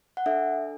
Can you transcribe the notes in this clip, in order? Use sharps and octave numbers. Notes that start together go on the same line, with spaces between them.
F#5
D4 A4 E5